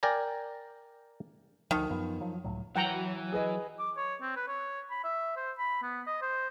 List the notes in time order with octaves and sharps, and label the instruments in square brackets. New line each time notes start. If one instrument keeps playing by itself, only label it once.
[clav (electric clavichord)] A#4 D5 G5 G#5 A#5
[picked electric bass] D2 F3 [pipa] D#3
[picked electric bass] F#2 F3 B3
F3 F#3
C#2 A2 F#3
[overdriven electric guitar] E3 [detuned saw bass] F#3 [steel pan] F#5 G5 A#5
[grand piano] G#4 B4 D#5
[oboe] D6
C#5
C4
B4
C#5
B5
E5
C5
B5
B3
D#5
C5